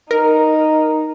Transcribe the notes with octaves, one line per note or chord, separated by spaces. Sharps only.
D#4 A#4